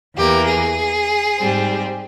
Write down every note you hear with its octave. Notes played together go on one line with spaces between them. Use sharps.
E2 E3 A#3 G4
G#4
G#2 G3 C4